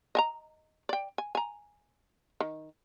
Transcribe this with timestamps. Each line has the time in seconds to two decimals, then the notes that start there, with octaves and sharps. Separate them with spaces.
0.15 D#5 G#5 A#5
0.89 D5 G5
1.18 G#5
1.35 G#5 A#5
2.40 D#3